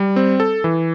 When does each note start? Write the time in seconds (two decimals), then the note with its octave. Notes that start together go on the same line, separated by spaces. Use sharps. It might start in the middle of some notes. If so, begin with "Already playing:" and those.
Already playing: G3
0.16 C4
0.40 A4
0.64 E3